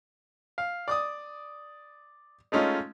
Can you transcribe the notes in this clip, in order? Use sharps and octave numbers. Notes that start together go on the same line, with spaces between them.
F5
D5 D6 D#6
G#3 A3 C#4 D#4 F4